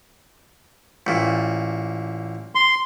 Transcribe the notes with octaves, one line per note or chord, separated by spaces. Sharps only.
A1 A#2
C6